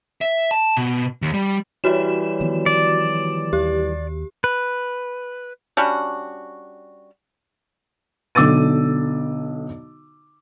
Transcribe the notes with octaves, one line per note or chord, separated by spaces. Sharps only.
E5
A5
B2
D#2
G3
E3 G3 F#4 C#5 E7
D#3 F3 B3
D5
D#2 G4
B4
G3 C#4 D4 F#4
B1 D3 D6 E6 A6 D#7